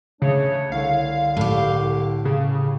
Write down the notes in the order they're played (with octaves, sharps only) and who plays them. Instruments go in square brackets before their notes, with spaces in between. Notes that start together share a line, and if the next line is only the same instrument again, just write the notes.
[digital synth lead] C#3 [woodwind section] A3 D4 C#5
[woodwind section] C2 D3 [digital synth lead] F5
[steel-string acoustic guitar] A2 G4
[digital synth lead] C#3